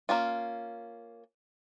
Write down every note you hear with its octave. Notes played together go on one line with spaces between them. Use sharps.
A#3 C#4 F4